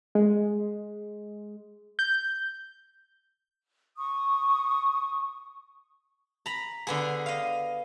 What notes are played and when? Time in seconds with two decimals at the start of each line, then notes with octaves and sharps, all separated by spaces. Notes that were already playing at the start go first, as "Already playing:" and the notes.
0.15 G#3
1.99 G6
3.96 C#6 D#6
6.46 A#5 B5
6.87 D3 B3 G#4
7.26 D#5 F5